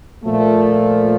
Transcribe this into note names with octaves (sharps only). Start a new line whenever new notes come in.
A#2 F3 A3